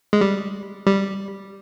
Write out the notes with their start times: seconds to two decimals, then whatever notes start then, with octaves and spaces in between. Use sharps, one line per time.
0.13 G#3
0.21 G3
0.86 G3